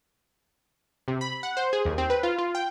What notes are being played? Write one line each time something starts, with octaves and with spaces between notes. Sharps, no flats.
C3
B5
F#5
C5
G#4
D#2
C4
B4
F4
F4
G5